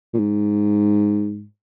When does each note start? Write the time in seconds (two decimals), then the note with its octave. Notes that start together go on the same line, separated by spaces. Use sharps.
0.13 A#2
0.19 G#2